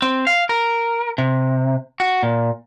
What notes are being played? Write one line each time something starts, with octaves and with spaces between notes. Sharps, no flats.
C4
F5
A#4
C3
F#4
A#2